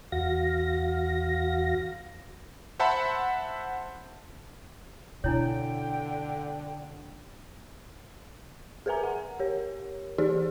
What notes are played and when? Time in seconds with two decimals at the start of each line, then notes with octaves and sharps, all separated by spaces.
0.12 E2 F#4 F5 A#6
2.80 C5 E5 F#5 A5 B5
5.24 B2 D3 D4 E4 C#5 G5
8.86 G#4 A#4 B4 E5 G#5 A#5
9.04 F#5
9.39 G4 A#4 C#5
10.18 E3 D#4 G4 G#4 C5 D5